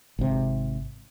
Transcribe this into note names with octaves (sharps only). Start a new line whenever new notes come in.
G#1 C3